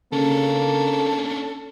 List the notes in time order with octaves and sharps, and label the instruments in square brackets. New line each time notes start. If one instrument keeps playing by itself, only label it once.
[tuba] C#3 [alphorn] A#3 [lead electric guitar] C#4 D4 [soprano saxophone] A4